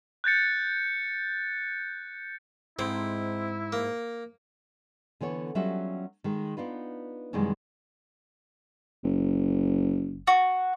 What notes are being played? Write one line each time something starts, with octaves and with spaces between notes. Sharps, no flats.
F#6 G6 A6 C#7
G#2 C4 E4
A#3
D3 E3 B3 C#5
F#3 G3 C#4 F4 F#4 E5
D#3 G#3
B3 D4 D#4 F4 B4
F#2 C3 D#3 E3 G3 G#3
F#1
F#4